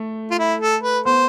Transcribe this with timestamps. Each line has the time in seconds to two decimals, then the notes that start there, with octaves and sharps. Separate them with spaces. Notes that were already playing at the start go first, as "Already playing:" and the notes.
Already playing: A3
0.31 F4
0.39 E4
0.61 A4
0.83 B4
1.05 B3 C5